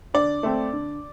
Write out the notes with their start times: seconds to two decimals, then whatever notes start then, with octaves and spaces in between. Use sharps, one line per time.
0.14 D3 D5
0.43 A3 C4
0.73 D3